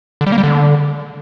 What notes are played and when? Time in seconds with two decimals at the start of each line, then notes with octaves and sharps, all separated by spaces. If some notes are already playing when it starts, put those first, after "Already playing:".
0.21 D3
0.27 G3
0.32 A#3
0.38 G3
0.43 D3